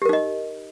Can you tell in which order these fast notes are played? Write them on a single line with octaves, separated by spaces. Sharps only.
G4 A#4 D#4 D#5